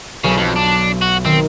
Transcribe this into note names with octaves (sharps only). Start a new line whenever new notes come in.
B1 C#3
F2 F4
D4
F#4
D#3 C4